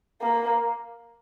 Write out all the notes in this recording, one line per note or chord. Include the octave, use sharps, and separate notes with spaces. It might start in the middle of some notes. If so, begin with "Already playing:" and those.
A#3